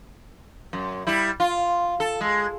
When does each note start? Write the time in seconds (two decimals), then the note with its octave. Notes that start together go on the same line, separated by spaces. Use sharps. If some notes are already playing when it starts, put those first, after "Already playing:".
0.73 F#2
1.07 G3 E4
1.40 F4
2.00 A4
2.21 G#3